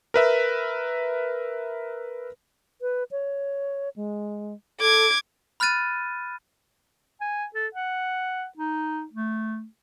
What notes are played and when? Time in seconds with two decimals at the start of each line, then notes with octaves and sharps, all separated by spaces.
0.14 A#4 B4 E5
2.81 B4
3.11 C#5
3.96 G#3
4.80 A4 D6 G#6
5.60 B5 F6 F#6 A6 D#7
7.21 G#5
7.55 A4
7.75 F#5
8.58 D#4
9.14 A3